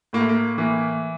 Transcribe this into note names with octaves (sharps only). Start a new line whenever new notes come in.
A2 A#3
A3
A#3
E3 A#3